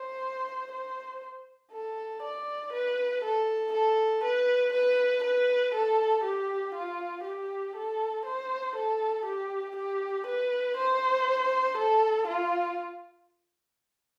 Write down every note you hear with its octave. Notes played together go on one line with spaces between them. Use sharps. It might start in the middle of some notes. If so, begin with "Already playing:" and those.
Already playing: C5
C5
A4
D5
B4
A4
A4
B4
B4
B4
A4
G4
F4
G4
A4
C5
A4
G4
G4
B4
C5
A4
F4